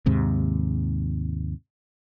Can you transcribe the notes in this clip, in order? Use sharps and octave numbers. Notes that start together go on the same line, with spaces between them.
D#2 G#2 C3